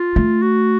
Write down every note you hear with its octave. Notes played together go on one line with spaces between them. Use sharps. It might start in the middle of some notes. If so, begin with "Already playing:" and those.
Already playing: F4
A3
F#4